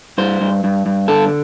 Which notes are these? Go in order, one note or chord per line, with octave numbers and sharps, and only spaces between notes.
G2 C5
G2
G2
G2
D3 A4